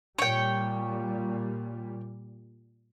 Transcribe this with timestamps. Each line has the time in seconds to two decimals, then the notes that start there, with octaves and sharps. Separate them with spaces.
0.19 A#2 G3 C#5 G5